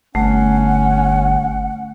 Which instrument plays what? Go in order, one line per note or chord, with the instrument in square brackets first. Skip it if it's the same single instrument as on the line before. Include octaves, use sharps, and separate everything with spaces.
[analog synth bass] G1 [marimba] A3 [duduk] C#4 [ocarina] F#5